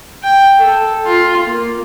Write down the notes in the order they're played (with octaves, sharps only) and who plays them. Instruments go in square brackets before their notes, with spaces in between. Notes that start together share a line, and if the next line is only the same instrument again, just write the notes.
[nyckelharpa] G5
A4
F4
A#3